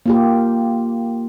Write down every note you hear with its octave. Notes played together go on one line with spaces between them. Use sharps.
A#3 F4 G4